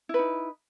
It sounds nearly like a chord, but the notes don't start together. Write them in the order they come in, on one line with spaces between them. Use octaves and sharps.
E4 B4 D#4